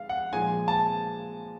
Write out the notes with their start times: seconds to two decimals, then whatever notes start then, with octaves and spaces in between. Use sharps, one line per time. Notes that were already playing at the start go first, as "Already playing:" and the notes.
Already playing: G#3 F5
0.09 F#5
0.32 A#2 F3 G#3 G#5
0.68 A5